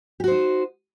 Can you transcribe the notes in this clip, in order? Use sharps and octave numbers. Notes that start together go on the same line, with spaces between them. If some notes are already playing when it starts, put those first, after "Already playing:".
D#4 F#4 G4 C5